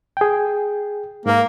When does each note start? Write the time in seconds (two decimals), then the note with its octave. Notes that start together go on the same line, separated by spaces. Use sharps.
0.17 G#4 G5
1.26 G#2 A#3 A#4